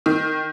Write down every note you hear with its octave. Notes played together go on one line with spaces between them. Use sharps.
D#3